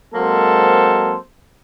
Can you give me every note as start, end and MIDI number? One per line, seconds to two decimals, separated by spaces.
0.14 1.16 54
0.14 1.16 56
0.14 1.16 58
0.14 1.16 60
0.14 1.16 69
0.14 1.16 72